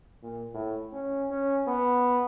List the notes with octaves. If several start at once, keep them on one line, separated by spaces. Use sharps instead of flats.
A#2
A2
C#4
C#4
B3